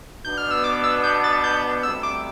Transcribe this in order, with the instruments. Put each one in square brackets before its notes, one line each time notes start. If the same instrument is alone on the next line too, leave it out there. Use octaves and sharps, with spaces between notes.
[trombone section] B2 B3 D4 [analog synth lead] G6
[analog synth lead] F6
E6
D6
E6
G6
A6
G6
[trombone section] D2 C3 G3 [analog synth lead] E6
[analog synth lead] D6